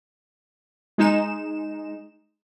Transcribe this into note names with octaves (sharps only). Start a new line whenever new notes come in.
G#3 D#4 E7